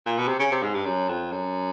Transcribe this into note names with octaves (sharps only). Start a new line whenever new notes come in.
A#2
B2
C3
C#3
C3
G#2
G2
F#2
F2
F#2